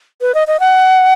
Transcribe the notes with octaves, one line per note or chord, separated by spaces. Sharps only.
B4
D#5
D#5
F#5